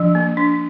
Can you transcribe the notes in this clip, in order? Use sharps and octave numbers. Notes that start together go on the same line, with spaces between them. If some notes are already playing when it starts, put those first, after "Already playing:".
Already playing: F3 D4
A#3
D4